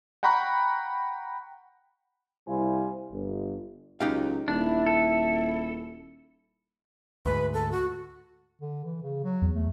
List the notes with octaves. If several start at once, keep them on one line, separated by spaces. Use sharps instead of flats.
F#5 G5 A#5 B5 C#6 F#6
C2 G3 E4 C5 F5 G#5
G1
C#2 F#3 D#4 G4 F5
D#1 D4 E4
A4
D2 G#2 B4
A4
F#4
D3
E3
C#3
F#3
E2
A3